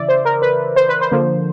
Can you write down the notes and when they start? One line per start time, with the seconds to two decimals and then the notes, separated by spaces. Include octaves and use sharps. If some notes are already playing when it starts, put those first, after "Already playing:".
Already playing: C#3 E3 D5 E5
0.09 C5
0.25 A#4
0.42 B4
0.76 C5
0.89 B4
1.01 C5
1.12 D3 F3 A#3